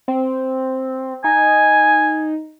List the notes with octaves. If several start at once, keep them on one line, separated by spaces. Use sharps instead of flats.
C4
D#4 G#5